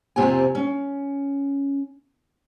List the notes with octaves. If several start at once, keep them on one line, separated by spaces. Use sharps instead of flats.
F2 C3 C4 F4 G4 G#5
C#4